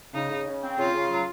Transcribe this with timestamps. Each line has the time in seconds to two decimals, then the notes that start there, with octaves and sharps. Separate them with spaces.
0.13 C#3 D#4
0.30 C#3
0.47 C#3
0.62 C4
0.78 C#3 F4
0.94 C#3
1.10 F#3